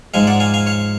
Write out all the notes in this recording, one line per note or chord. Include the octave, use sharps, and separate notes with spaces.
G#2 F3 G#3 F5 G#5
D5 F#5
F5 G#5
F5 G#5
C#5 F5